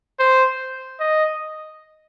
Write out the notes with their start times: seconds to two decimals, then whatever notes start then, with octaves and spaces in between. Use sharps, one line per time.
0.20 C5
1.00 D#5